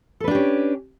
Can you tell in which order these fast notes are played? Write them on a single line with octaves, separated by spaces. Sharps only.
A4 B4 D4 G4 C#4